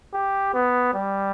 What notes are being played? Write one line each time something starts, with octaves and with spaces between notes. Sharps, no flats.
G4
B3
G3